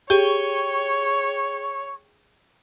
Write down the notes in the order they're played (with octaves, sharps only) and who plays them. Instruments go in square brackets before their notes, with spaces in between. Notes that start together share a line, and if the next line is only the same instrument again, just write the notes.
[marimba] G4 [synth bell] G#4 G5 G7 [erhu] C#5 [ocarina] C#6